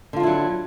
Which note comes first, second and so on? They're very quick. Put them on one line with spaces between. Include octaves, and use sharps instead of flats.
D3 F4 D4 E4 F#3